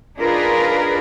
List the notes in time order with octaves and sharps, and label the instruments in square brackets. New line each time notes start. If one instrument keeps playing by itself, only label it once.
[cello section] D4 D#4 F4 G#4 A#4 B4